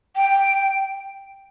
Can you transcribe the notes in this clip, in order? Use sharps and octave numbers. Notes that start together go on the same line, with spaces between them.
G5